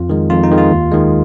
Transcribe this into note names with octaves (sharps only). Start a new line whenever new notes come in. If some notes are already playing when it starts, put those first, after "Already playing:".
Already playing: F2 F4
D#3 G#3
F2 F4
D#4
D#3 G#3
F4
D#2
D#3 G#3